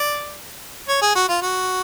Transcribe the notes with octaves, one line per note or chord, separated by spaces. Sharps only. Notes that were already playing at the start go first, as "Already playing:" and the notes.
Already playing: D5
C#5
G#4
F#4
F4
F#4